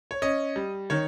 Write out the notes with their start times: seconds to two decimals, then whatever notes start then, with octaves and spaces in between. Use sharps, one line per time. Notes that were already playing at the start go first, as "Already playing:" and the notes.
0.11 C#5
0.22 C#4 D#5
0.56 G3
0.90 D#3 C#5